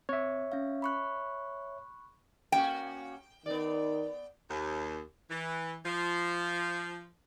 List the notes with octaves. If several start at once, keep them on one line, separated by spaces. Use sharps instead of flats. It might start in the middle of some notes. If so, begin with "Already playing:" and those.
C4 C#5 E5
C#4 F5
B5 C#6 F#6
A#3 C#4 F#4 G5
D#3 B3 D5
D#2
E3
F3